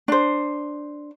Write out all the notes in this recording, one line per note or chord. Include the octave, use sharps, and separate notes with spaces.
D4 C5